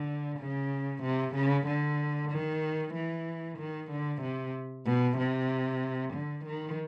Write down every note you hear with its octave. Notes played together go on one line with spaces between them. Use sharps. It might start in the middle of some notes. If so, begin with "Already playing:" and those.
Already playing: D3
C#3
C3
C#3
D3
D#3
E3
D#3
D3
C3
B2
C3
D3
D#3